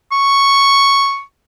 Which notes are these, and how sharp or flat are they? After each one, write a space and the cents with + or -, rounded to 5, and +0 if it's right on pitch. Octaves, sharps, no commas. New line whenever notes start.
C#6 +0